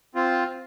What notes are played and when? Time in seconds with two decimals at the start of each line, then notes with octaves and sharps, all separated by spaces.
0.15 C4 F4